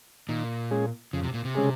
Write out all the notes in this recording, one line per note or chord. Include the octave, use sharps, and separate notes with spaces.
A#2 D#3
G#3 C#4 G#4
F2 C#3
C3
A#2
C3
C#3 G#3 C#4 G#4